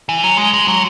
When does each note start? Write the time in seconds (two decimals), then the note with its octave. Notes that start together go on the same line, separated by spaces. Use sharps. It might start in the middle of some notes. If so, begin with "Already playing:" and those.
0.09 E3
0.24 F#3
0.38 G#3
0.53 G#3
0.68 F#3